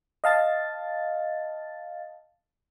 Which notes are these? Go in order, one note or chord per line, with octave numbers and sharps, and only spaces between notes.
D#5 F5 A5 A6